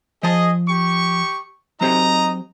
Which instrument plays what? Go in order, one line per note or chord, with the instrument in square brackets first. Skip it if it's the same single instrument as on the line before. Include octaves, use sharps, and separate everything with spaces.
[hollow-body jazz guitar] F3 A5 [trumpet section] G#4 D#5
[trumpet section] G4 C#6
[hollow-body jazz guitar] F#3 C4 G4 [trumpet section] D#4 D#5 A#5